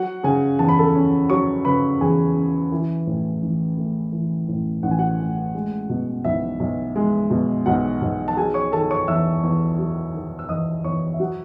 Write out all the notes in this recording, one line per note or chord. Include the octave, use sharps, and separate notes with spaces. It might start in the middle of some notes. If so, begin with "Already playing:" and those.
Already playing: F#3 F#4 F#5
C#3 G#4 G#5
E2 A5
B5
A4 A5
C#4
F#3 C#5 C#6
C#3 B4 B5
E2 G#4 G#5
C#4
E3
A2
A1
A3
E3
A2
A1 F#5
G#5
F#4 F#5
A3
G#3
B2
B1 E4 E5
B1
G#3
B2
B1 F#4 F#5
B1
A5
F#3 G#4 G#5
C#5 C#6
D#3 A4 A5
C#5 C#6
E2 E5 E6
E2
F#3
D#3
E6
E2 D#5 D#6
E2 C#5 C#6
E5
F#3 F#4 F#5